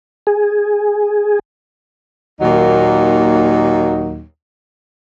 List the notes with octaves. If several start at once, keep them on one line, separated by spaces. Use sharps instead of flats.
G#4
D#2 A#2 D#3 F#3 A#3 D#4